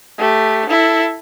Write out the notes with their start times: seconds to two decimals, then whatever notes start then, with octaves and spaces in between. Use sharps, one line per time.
0.18 A3 G4
0.69 E4 A4